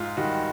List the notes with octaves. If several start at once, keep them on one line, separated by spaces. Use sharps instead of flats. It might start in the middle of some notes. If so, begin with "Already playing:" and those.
Already playing: G#2 F4
D#3 G3 F#4